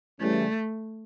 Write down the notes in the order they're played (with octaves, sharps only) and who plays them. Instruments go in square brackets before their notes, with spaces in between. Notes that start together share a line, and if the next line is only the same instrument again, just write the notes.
[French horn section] C#3 E3 G3 [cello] A3